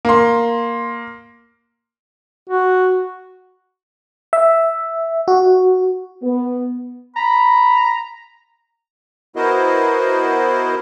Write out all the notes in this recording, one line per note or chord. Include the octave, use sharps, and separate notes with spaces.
A#3 C6
F#4
E5
F#4
B3
A#5 B5
B3 E4 F#4 A#4 C5 D#5